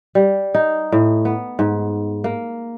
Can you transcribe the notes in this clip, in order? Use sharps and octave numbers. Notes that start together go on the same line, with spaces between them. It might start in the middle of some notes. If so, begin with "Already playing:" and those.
G3
D#4
A2
B3
G#2
A#3